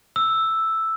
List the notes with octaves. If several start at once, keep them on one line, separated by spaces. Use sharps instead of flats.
E6